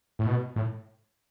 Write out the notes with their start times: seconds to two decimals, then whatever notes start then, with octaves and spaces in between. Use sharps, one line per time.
0.19 A2
0.26 B2
0.56 A2